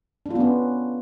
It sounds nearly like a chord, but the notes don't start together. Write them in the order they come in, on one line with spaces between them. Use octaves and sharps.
D4 F4 B3 C#4